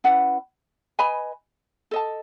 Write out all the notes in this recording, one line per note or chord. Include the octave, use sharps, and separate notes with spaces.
C#4 E4 B4 F#5
B4 D#5 G#5 B5
A4 D#5 A5